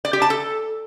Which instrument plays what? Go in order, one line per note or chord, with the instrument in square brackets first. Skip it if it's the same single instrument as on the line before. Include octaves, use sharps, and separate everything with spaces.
[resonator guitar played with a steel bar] D5
G4
A5
A4